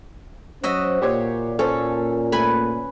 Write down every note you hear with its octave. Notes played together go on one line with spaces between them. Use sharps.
F#3 C#4 F#4 C5 D#5 E5
A#2 G4 C5 C#5
C#4 A4 C5
A3 B4 G#5 B5